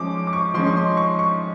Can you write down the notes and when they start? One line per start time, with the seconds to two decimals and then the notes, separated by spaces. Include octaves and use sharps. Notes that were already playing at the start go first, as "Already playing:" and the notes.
Already playing: F3 G#3 C#4 D6
0.27 D6
0.33 C#6
0.54 F3 G#3 C#4 C6
0.67 C#6
0.76 C6
0.97 C#6
1.19 C#6